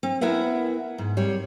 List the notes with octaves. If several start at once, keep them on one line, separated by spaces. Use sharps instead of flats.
C4
B3 E4 A#4 B4 E5 F#5
G#2
G3 C4 C#5